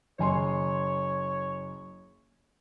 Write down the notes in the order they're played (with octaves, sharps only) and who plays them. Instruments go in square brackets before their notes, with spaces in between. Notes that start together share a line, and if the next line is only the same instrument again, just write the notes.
[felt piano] F#1 G#5 C6 [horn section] C#5